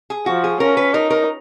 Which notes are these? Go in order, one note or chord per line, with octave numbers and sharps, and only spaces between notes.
G#4
F3 F#4
G#4
C#4 A#4
B4
D#4 A#4
A#4